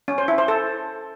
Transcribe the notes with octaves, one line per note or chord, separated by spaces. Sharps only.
C#4
C5
E4
C5
A4